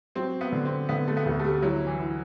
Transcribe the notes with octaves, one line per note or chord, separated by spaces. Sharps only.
F#3 C4
B3
D3
C4
D3 B3
A3
B3
D2 A3
A3
G3
F#3 E4
E3
E4